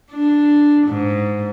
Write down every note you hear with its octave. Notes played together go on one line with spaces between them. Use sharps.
D4
G#2